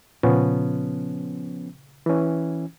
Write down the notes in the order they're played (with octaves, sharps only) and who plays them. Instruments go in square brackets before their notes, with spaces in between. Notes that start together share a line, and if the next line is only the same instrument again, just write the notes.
[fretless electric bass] A#2 C#3 [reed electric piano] F3 B3 C#4
[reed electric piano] E3 C#4